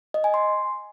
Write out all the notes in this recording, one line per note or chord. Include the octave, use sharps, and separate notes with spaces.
D#5
G#5
C6